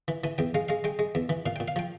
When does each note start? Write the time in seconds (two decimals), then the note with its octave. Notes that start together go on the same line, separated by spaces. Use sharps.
0.08 E3
0.24 E3 G#5
0.38 E2 G5
0.54 G#3 F5
0.69 G#3 F5
0.84 G#3 G5
0.99 G#3
1.15 E2
1.29 E3
1.46 A#2 F5
1.56 A#2 G5
1.68 F5
1.76 F3 G5